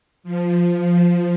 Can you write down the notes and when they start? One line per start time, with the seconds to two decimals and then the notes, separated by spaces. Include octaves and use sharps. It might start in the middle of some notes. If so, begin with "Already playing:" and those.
0.23 F3
0.72 F3